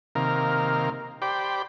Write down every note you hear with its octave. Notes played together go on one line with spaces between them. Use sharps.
C3 D#3 A#3 A#4 F5
G4 C5 D5 G5 B5